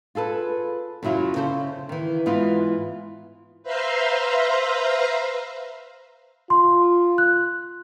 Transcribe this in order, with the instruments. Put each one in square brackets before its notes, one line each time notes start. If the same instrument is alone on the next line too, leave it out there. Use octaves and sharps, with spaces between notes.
[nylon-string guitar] F4 G#4 A4 B4
F#2 C#3 F#3 E4 F4
C#3 A4 C5
D#3 E3
G#2 E3 B3 F4
[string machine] B4 C5 E5 F5 A#5 C6
[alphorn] F4 [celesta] C6
[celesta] F#6